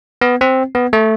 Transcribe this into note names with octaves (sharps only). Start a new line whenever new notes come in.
B3
C4
B3
A3